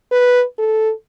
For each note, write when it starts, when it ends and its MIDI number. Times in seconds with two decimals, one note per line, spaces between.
0.12 0.44 71
0.58 0.91 69